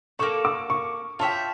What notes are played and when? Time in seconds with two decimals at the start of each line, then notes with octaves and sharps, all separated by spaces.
0.19 A#3 E4 A4 D5 C#6
0.45 D6
0.70 C#6
1.19 F4 C#5 E5 G5 A5